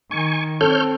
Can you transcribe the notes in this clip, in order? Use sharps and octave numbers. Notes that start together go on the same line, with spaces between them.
D#3 G#5 C#6
C4 A4 C#5 F6 G6